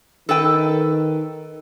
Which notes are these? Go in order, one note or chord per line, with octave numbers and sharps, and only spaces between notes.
D#3 A4 B4 G5